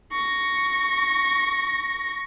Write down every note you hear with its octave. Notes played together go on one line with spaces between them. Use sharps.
C#6 A#6